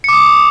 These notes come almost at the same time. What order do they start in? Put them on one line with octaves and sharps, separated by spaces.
C#7 D6 D#6